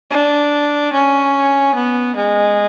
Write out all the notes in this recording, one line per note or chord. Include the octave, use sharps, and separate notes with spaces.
D4
C#4
B3
G#3